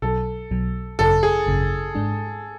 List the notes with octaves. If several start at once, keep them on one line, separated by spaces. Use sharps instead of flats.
B1 B2 F#3 A4
B1 B2 F#3
G#1 F#2 C#3 A4
G#4
G#1 F#2 C#3
G#2 G#3 D4